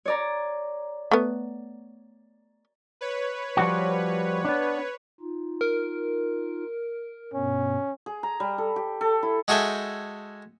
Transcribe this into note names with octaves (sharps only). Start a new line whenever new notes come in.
C#5 D5 A#5
A3 B3
B4 C#5
F3 G3 F#4
B3 D4
D#4 F4
A#4
G2 B2 B3 C#4
G#4
A#5
G3
A4
G4
A4
E4
G#3 F#4 G#4 A4 E5 G5